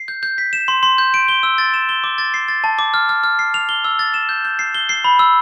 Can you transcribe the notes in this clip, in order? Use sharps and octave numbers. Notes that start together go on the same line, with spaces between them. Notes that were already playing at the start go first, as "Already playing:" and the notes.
Already playing: C7
G6
G6
B6
E7
C6
C6
G6
D7
G7
E6
A6
E7
G7
D6
A6
C7
A6
A5
D6
F6
F6
F6
C7
F7
G7
E6
A6
E7
G6
G6
C7
G7
C7
B5
E6